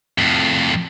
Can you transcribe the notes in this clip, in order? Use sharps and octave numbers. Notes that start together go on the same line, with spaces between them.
F2 A2